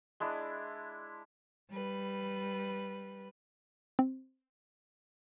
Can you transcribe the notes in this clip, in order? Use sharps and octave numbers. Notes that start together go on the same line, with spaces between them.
G#3 D4 E4
G3 B4
C4